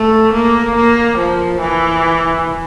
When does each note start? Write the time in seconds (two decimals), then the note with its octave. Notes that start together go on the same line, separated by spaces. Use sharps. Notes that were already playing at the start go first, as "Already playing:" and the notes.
Already playing: A3
0.33 A#3
0.76 A#3
1.18 F3
1.60 E3